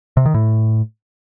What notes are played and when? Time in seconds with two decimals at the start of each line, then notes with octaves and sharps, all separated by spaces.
0.17 C3
0.26 D#3
0.34 A2